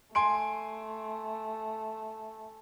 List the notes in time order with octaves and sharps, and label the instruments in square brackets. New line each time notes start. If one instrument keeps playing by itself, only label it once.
[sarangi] A3 [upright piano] G#5 C6 D7